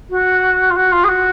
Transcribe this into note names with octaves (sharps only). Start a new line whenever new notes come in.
F#4
F4
F#4
F4
G#4
F#4